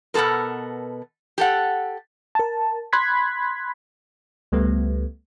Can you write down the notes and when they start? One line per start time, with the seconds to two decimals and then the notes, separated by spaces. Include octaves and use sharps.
0.14 B2 B3 F#4 A4 A#4
1.38 G4 A4 F#5
2.35 A#4 A5
2.93 B5 C6 F#6 G#6 B6
4.52 C#2 G3 A3 B3